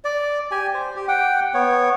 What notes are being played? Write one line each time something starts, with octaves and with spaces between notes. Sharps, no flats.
D5
G4 G#5
C5
G4
F#5 G5
B3 C#5